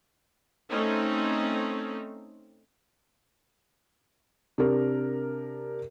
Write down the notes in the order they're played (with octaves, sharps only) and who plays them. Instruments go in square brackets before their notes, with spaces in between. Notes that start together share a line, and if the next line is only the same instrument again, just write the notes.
[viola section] A3 C4 C#4 D#4
[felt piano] C3 D4 A#4